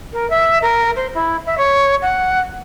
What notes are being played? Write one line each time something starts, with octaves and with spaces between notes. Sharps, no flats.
A#4
E5
A#4
C5
E4
E5
C#5
F#5